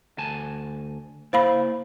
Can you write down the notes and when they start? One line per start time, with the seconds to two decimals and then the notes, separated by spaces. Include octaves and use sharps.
0.18 D2 G#5 A5
1.33 A#3 E4 C5 F5 B5